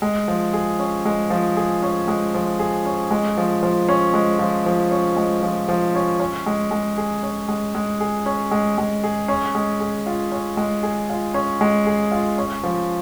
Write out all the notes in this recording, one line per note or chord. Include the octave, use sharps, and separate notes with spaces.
G#3
F3
G#4
C#4
G#3
F3
G#4
C#4
G#3
F3
G#4
C#4
G#3
F3
F3
C#4
G#3
F3
F3
C#4
G#3
F3
F3
C#4
C#4
G#3
G#3
G#4
C#4
G#3
G#3
G#4
C#4
G#3
G#3
G#4
C#4
G#3
G#4
F4
C#4
G#3
G#4
F4
C#4
G#3
G#4
F4
C#4
F3